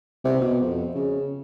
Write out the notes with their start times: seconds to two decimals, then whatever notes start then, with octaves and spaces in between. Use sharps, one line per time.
0.24 C3
0.41 B2
0.62 F2
0.95 C#3